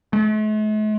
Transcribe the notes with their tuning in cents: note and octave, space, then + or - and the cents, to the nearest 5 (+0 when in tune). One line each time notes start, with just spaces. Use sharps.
A3 -45